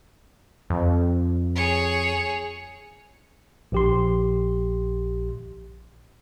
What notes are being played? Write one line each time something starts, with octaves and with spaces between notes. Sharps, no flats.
F2
G#4 C#5
A#1 G4 C6